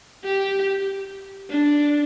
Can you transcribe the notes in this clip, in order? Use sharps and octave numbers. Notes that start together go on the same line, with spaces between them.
G4
D4